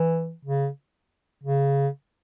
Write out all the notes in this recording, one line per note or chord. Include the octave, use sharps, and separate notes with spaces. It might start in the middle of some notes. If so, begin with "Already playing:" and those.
Already playing: E3
C#3
C#3